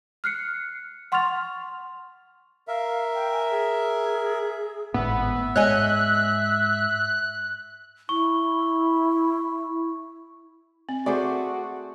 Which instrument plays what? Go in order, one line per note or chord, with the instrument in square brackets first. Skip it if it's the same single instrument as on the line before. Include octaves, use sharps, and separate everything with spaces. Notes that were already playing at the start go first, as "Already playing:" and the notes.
[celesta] F6 F#6 C7 C#7
F#5 C6 C#6 F6 A6 F7
[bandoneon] A#4 E5 [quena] F5
[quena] G5
G#5
G#4
[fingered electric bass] G#1 A2 [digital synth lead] B3 [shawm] E5
[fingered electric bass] G#2 [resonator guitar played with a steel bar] C#5 D#5 G#5 [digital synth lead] F#6
[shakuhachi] E4 [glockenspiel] C#6
[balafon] C4
[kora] A3 G#4 C5 [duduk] F#4 [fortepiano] D5